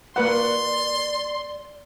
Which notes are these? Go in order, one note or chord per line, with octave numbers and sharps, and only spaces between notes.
A#3 B4 D5 F#5 C6